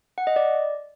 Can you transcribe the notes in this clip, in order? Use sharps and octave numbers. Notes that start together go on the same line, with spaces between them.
F#5
D#5
D5